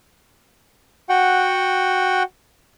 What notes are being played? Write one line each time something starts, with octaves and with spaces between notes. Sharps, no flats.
F#4 F#5 G5